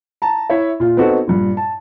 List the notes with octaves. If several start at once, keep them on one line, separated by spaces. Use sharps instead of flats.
A5 A#5
E4 C#5 E5
A#2 F4
B3 C4 D#4 F#4 A4
G2 A#2
A5